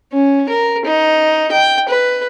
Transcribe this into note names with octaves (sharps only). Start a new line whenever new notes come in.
C#4
A#4
D#4
G5
B4